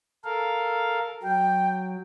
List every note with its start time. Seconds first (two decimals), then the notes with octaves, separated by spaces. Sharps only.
0.24 A4 A#4 F5
1.23 F#3 G5